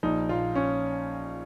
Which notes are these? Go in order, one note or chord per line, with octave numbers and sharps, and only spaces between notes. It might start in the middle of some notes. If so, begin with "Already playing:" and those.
A#1 D#4
A#2 F3 F4
C#4